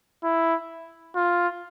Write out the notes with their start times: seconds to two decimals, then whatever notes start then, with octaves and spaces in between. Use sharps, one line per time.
0.24 E4
1.16 F4